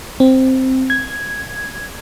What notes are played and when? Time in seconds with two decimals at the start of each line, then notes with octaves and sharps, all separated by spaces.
0.20 C4
0.90 G#6